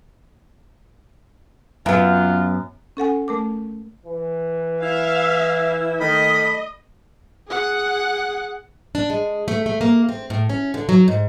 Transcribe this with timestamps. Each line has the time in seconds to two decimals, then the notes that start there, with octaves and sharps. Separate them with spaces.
1.86 F#2 B3 F4
2.97 C#4 A4 F#5 G#5
3.28 A3 A#4 D6
4.06 E3
4.83 E4 E5 F5
6.01 D#3 A3 D#5 B5
7.48 G#4 F#5
8.95 D4
9.10 G#3
9.48 A3
9.66 A3
9.81 A#3
10.09 C4
10.30 A2
10.50 C#4
10.74 D3
10.89 F#3
11.08 G#2